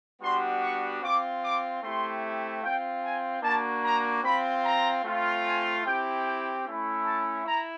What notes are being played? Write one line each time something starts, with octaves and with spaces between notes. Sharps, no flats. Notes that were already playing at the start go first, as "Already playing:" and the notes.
G3 B3 D4 F#4 C6
C#6
C4 F4 D6
D6
A3 C4 E4 G4 C6
C4 F4 G5
G#5
A#3 D4 F#4 A5
A#5
C4 F4 B5
A#5
A3 C4 F4
G#5
C4 E4 G4 G5
G5
A3 C#4 E4
A5
E4 A#5